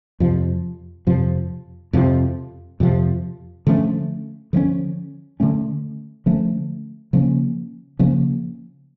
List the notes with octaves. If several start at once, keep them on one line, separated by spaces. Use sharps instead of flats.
F2 C3 F3
F2 C3 F3
F2 C3 F3
F2 C3 F3
D3 F3 A3 C#4
D3 F3 A3 C#4
D3 F3 A3 C#4
D3 F3 A3 C#4
C#3 F3 A#3 C#4
C#3 F3 A#3 C#4